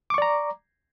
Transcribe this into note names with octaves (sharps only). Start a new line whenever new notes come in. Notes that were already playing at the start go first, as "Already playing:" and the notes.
D5 A#5 C#6 D6